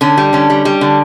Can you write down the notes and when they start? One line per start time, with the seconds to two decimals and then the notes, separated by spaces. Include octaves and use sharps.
0.01 D3 C#4
0.17 G3
0.33 D3 C#4
0.50 G3
0.65 G3
0.81 D3